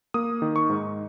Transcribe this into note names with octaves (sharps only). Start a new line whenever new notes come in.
A#3 D#6
D#3
C#6
G#2